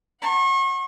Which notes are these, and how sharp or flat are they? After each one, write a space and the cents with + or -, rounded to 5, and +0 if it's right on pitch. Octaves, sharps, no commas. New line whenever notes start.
F#5 +0 C#6 -40